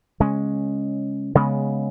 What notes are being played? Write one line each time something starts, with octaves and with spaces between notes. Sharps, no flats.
C#3 G#3 C#4
C#3 G#3 B3